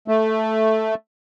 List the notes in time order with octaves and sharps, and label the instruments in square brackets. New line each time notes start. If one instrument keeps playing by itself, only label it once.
[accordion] A3